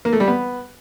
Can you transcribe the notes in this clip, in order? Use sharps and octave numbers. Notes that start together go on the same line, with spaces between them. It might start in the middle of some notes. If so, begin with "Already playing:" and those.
A#3
A3
G3
B3